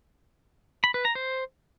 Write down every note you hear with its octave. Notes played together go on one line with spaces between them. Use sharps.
B5
B4
A#5
C5